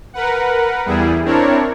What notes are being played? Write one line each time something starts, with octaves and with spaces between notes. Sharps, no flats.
A#4 B4 F#5
E2 G3 E4 G#4
C4 D4 E4 A#4 C#5